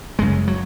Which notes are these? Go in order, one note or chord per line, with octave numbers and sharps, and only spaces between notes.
F#1 F#2 C#3 G#3
F#3